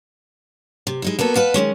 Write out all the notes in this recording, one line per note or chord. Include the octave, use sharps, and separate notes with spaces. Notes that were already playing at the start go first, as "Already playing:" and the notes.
C3
G#3 D#4 E4
A#3 B3 F#4 A4
B4 D#5 F5 F#5 A5
D#3 F#3 G#3 C#4